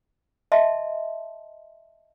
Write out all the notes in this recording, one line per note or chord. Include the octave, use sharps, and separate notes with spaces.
D#5 E5 A5 C6